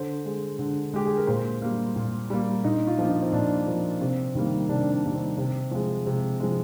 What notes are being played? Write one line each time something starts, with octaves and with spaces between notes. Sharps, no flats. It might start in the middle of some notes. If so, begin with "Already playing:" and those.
Already playing: D3 C5
G#3
D3
G#3 G4
G#4
A#4
A#2 C5
G3 A#3
A#2
G3 A#3
A#2 D#4
F4
F3 A#3
D#4
C4
A#2 D4
F3 A#3
C3 C4
D#3 G3 A#3
C3 D4
D4
D#3 G3 A#3
C4
C3
F3 G#3
C3
F3 G#3